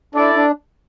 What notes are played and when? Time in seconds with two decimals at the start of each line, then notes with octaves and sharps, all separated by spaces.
0.14 D4 E4 A4 D5
0.36 D4